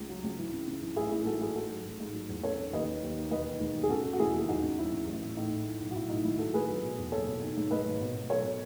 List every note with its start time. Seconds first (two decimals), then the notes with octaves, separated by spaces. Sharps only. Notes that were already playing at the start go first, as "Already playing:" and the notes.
Already playing: C#2 C#3
0.09 F#3
0.24 C#2
0.38 E3
0.53 C#3
0.67 C#3
0.82 E3
0.96 A1 E4 G#4
1.11 G#2 E4 G#4
1.26 G#2 F#4 A4
1.41 G#2 E4 G#4
1.55 G#2 F#4 A4
1.70 F#3
1.85 A1
2.00 G#2
2.14 F#3
2.29 E2
2.43 C#3 A4 C#5
2.59 C#3
2.73 D#2 B4 D#5
2.87 D#2
3.03 D#2
3.17 D#2
3.31 E1 B4 D#5
3.47 D#3
3.60 E1
3.76 D#2
3.83 G#4
3.89 C#3 F#4 A4
4.05 C#3
4.13 F#4
4.19 E1 E4 G#4
4.34 D#2
4.49 E2 D#4 F#4
4.63 C#3
4.78 F#3 E4
4.93 C#3
5.07 A1
5.21 A1
5.36 A2 D#4
5.51 A2
5.67 E3
5.80 B1
5.91 F#4
5.95 B1 E4
6.09 A2 D#4
6.24 G#1 E4
6.39 F#3 F#4 A4
6.54 G#1 G#4 B4
6.68 F#3
6.83 B2
6.98 E2
7.12 F#1 A4 C#5
7.27 B2
7.41 D#3
7.57 G#2
7.71 G#2 B4 D#5
7.85 G#1
8.01 B2
8.15 B2
8.29 F#3 A4 C#5
8.44 B2